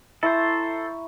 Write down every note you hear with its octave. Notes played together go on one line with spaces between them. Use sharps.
E4 A4 C5 A#5 C#6